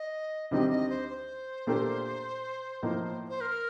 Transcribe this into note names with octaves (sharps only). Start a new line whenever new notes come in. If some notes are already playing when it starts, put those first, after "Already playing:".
Already playing: D#5
D2 C3 D#3 G3 C4 D#5
D#5
C5
C5
A#2 A3 D4 G4 A#4
A2 F3 A#3 D#4
C5
A#4